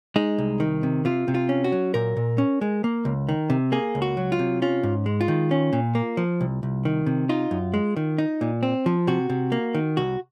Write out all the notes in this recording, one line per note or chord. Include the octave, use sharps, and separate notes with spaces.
G#3 D#4
C2
D#3
C3
C3 F4
C3
F4
C#4
F#4
F#3
A#2 A#4
A#2
C#4
G#3
A#3
C#2
D#3
C3
A#3 G#4
C#2
F#4
F#3
F4
C3
C#4 F4
G#2
G#3
F4
D#3
C#4
A#2
A#3
F3
C2
C2
D#3
C3
D#4 F4
F#2
G#3
D#3
D#4
A#2
C4
F3
C3 F#4
C3
A#3
D#3
C2 F#4